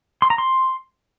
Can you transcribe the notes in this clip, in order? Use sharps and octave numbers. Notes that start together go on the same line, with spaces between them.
C6
A#5
C6